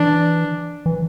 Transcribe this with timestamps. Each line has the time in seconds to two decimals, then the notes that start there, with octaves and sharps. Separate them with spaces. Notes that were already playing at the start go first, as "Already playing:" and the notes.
Already playing: E3 D4
0.86 E3